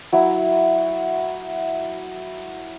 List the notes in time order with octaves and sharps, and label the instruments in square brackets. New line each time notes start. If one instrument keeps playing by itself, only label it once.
[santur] F#3 E4